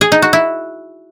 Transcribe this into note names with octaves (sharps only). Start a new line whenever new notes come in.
G#4
D#4
F#4
E4